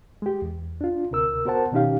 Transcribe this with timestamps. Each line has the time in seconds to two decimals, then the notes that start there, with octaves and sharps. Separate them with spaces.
0.22 G#3 G4
0.42 E2
0.81 D4 F4
1.11 D2 C3 A#4 E6
1.45 B3 F#4 A#4 C5 F#5 A5
1.72 B2 D#3 C#4 D#4 G4 F5